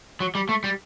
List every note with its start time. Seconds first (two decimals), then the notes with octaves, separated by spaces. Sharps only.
0.20 F#3
0.35 G3
0.49 A3
0.64 G3